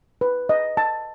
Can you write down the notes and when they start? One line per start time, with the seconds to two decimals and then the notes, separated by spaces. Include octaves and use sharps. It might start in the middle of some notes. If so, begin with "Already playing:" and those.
0.21 B4
0.49 D#5
0.77 A5